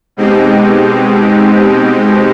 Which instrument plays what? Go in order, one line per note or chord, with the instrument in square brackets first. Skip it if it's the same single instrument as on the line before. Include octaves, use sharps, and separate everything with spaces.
[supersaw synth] B2 G#3 C4 D#4 G4